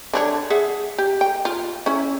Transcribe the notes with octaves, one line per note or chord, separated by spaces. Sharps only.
D3 D4 C#5
G#4 E5 F#5
G4
G5
F4
C#4 E4